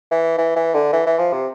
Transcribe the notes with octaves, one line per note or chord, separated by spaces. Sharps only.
E3
E3
E3
D3
E3
E3
F3
C3